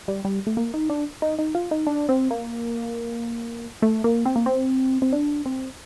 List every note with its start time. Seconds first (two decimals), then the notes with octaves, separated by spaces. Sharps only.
0.08 G3
0.25 G3
0.47 A3
0.57 A#3
0.74 D#4
0.90 D4
1.22 D#4
1.39 D#4
1.55 F4
1.71 D#4
1.87 D4
2.09 C4
2.31 A#3
3.82 A3
4.04 A#3
4.25 C4
4.36 A#3
4.46 C4
5.02 C4
5.13 D4
5.46 C4